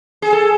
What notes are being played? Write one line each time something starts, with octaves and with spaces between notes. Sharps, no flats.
G#4
A4